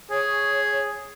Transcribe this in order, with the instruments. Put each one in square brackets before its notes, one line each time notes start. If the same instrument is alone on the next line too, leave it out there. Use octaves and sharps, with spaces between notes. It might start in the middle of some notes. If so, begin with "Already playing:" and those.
[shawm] G#4 [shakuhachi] C#5